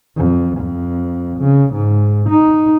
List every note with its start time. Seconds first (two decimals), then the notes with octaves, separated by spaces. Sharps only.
0.17 F2
0.58 F2
1.39 C#3
1.74 G#2
2.29 D#4